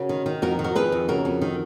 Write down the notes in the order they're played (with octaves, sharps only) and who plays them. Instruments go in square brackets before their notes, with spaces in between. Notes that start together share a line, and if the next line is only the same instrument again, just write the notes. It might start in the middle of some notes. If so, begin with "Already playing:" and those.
Already playing: [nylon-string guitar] C#3 F#4 A#4
D#3
D#3
F2 F#4 A#4
D#3
F#4 A#4
F2 G#4 B4
F2
C#3 F#4 A#4
F2
D#3